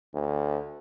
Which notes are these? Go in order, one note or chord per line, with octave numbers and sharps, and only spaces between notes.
D2